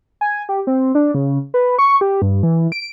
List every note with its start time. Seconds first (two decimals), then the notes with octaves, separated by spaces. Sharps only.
0.21 G#5
0.49 G4
0.67 C4
0.95 D4
1.14 C#3
1.54 B4
1.79 C#6
2.01 G4
2.22 G2
2.43 E3
2.72 D7